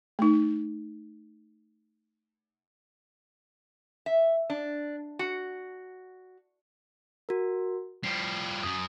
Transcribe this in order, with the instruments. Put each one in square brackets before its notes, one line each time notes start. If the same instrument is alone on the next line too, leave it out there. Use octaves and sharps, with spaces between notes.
[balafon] A3 D#4
[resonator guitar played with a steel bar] E5
D4
F#4
[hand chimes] F#4 A#4
[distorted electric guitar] F3 G3 [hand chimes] C7
[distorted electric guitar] F#2 [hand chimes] D#6